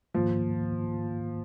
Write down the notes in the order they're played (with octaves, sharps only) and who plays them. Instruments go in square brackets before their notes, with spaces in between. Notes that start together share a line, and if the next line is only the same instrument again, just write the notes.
[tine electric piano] G#2 D#3 A#3 F4 [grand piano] F3